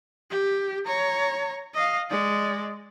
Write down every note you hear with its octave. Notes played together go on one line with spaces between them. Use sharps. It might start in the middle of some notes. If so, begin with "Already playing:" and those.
G4
C#5 A#5
D#5 F5
G#3 D5